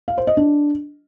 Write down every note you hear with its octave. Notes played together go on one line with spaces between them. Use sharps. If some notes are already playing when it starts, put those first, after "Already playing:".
F5
C5
D#5
D4